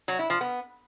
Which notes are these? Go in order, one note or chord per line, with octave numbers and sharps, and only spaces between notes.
F#3
E4
F3
B3